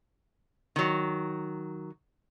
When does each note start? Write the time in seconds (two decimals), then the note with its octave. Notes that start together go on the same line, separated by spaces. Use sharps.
0.76 D#3 F#3